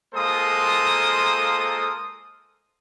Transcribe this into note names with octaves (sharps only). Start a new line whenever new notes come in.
G#3 A#3 F4 A4 C5 D#6